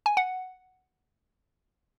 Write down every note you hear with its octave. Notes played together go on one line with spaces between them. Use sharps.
G#5
F#5